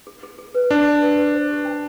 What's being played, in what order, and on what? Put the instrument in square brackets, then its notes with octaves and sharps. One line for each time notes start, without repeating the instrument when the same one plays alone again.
[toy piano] G#4
G#4
G#4
B4
[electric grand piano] D4 [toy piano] G#4
[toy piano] D#5
B4
B4
C5
G4
G5